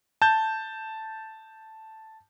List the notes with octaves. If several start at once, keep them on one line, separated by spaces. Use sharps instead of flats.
A5 G6